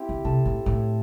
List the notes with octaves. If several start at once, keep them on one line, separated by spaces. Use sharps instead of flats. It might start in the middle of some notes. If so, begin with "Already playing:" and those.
Already playing: C4 E4 G4
D3
C3 A4
A2
A2